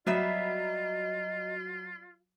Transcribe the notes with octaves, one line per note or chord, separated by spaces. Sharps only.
F#3 G3 B3 F4 D#5 E5